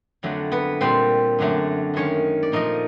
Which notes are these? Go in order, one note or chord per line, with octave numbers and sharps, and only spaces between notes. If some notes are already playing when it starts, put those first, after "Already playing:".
F2 D3 F#3 A3
B3 B4
A#2 G3 C4 C5
F#2 D3 F#3 A3
F#2 D#3 G#3 C#4 C#5
D5
A#2 F3 A3 D#4 D#5